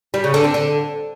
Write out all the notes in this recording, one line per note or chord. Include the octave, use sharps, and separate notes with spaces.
G3
C#3
D3
C4
D3